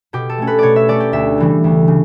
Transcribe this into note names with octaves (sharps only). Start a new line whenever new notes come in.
B2 G4
A4
A3 C#4
B4
B2 C#5 D5
E5
A3 C#4 D5
G4
D2 E5
C#3 E3 G3
D2
C#3